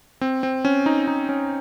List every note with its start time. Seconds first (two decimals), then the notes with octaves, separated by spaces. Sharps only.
0.21 C4
0.43 C4
0.65 C#4
0.86 D#4
1.07 D#4
1.29 C#4